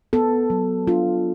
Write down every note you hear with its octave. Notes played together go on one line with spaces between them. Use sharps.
B3 A4
F#3
D4 F4